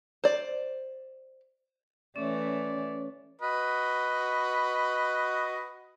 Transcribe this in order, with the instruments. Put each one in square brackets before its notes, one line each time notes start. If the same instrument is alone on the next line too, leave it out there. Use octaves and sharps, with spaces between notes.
[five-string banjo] C5 D5
[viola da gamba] E3 A3 [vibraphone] C#4 C#5 [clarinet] D5
[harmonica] F#4 B4 D#5